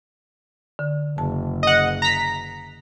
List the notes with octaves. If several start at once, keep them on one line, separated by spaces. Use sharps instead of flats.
D3
F#1 A5
D#5 F#5
A#5 B6